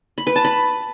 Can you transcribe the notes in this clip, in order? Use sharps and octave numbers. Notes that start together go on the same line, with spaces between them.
B5
B4
A5
B5